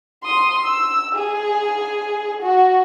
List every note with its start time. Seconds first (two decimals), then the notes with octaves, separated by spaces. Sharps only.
0.24 C6 D#6
0.65 E6
1.15 G#4
2.43 F#4